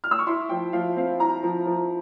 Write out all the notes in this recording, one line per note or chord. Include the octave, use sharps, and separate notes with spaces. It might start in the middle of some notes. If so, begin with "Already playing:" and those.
F6
E6
C#6
E4 C6
F3 G5
F3 F5
C4 F5
E4 A#5
F3
F3